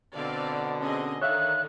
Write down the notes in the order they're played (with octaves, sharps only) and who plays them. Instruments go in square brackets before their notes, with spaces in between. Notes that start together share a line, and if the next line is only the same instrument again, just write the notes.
[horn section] B2 D3 [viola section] C4 D5 F5
[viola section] C4 G#4 D#5 [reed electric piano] C#4
[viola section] D3 D#3 [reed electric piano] C#5 E5 F5 [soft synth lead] F#6